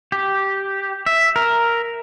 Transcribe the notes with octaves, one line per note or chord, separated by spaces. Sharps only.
G4
E5
A#4